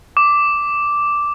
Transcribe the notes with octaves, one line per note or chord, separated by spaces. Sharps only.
D6